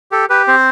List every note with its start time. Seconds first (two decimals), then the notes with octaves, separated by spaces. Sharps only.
0.11 G4 A4
0.30 G4 B4
0.48 C4 C5